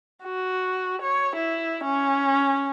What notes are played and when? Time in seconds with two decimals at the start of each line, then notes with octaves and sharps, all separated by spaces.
0.24 F#4
1.02 C#5
1.36 E4
1.84 C#4